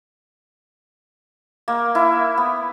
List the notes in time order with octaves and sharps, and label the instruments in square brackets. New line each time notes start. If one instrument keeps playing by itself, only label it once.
[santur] A#3
E4
B3